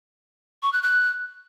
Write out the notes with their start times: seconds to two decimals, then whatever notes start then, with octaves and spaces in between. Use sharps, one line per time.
0.63 C#6
0.73 F#6
0.83 F#6